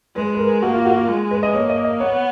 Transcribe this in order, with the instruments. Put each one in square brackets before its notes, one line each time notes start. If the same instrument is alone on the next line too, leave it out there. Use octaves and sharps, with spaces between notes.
[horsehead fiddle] G#3 [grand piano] B4
[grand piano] B4
A#4
[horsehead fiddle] A#3 [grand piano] F#4
[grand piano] F4
F#4
F4
[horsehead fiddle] G#3
[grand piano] B4
D#5
[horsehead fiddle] A#3 [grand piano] C#5
[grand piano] D#5
D#5
[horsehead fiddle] B3 [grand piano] C#5